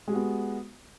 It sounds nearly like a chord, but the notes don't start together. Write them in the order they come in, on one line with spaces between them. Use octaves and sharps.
G#3 G4 F#4 B3